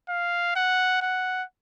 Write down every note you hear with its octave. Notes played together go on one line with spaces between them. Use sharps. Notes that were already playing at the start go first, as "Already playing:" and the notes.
F5
F#5
F#5